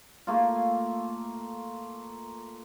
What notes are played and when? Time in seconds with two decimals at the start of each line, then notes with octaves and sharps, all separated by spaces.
0.27 A3 A#3 F4